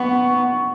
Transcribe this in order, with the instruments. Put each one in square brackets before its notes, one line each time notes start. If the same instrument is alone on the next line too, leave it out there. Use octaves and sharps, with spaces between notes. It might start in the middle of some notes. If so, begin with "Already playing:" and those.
Already playing: [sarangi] B3 [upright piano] C#6